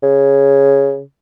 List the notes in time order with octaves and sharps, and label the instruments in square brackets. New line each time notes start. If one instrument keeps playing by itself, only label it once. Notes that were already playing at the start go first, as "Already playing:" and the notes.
[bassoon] C#3